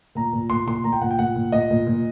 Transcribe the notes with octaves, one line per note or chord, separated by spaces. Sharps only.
A#2 A#5
A#2
A#2 C6
A#2 C6
A#2 A#5
G5
A#2 F#5
G5
A#2 F#5
A#2
A#2 D#5
A#2
A#2